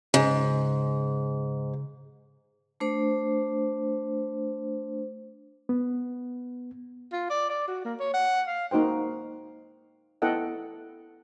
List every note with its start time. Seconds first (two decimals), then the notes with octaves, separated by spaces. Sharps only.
0.14 G#2 C#3
2.80 A3 D4 C5
5.69 B3
7.13 F4
7.30 D5
7.50 D5
7.68 F#4
7.85 A#3
8.00 C#5
8.14 F#5
8.47 F5
8.71 A#3 D#4 F#4 C5 G5
10.22 B3 E4 A4 D#5 F#5 G5